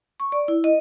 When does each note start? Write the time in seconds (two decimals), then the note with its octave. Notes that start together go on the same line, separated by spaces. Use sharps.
0.20 C#6
0.32 D5
0.48 E4
0.64 D#5